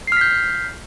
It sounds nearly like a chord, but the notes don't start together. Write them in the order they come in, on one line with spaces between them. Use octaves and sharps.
C7 F6 B6 G6